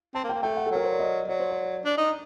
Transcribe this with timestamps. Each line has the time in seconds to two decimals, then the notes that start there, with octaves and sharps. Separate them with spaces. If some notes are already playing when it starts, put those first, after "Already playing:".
0.14 C4 A5
0.24 A#3
0.29 G5
0.34 A#3
0.42 A3 G5
0.57 F#5
0.66 A4
0.71 F#3 A#4
0.84 C5
0.91 D5
1.00 D#5
1.28 F#3 D5
1.39 C5
1.51 D5
1.84 D4
1.98 D#4